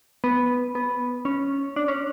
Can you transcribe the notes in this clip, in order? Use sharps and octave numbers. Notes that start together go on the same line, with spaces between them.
B3
B3
C#4
D4
C#4